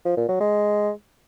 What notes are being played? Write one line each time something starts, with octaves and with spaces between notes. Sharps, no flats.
F3
A#2
F#3
G#3